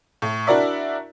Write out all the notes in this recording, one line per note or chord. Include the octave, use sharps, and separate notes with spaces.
A2
D4 E4 F#4 A#4 D5 E5